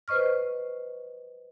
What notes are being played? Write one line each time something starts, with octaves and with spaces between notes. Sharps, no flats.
B4 C5 D#5 C#6 F6